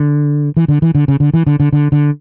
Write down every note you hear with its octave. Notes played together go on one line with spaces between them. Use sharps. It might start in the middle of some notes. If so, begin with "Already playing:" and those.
Already playing: D3
E3
D3
E3
D3
C#3
D3
E3
D3
D3
D3
D3